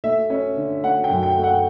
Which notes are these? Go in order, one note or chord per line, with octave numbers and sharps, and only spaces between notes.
A3 E5
C#4
D3
A3 F#5
G5
F#2
G5
A3
F#5